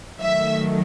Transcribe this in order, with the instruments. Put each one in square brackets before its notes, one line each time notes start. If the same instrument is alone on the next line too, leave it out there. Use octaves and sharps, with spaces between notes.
[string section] D#3 F#3 A3 E5